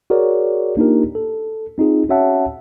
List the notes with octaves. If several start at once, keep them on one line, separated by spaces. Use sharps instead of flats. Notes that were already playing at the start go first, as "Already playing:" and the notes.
F#4 G#4 A#4 C#5 D5
A#3 D4 D#4 F4 G4 A#4
A4
C4 D#4 F4 G#4
C#4 F#4 C#5 E5 F#5 A5